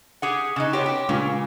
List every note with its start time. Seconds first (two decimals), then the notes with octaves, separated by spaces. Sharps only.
0.22 G4 G#4 F#5
0.56 C#3 D#4 F#6 C#7 E7
0.73 B3 G4 C#5 C6
0.86 G4
1.09 A#2 C#3 G#3 F4